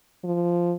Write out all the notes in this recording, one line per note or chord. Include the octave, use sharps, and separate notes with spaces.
F3